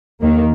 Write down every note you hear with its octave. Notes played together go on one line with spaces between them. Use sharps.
D#2 D#3 A#3